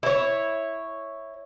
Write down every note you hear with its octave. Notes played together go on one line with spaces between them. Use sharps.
E4 C#5